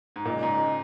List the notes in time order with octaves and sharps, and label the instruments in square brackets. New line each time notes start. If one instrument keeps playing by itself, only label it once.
[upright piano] G#2
[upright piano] A#2 [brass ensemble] C#3 G#3 C#4 G#4 D#5
[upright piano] G#2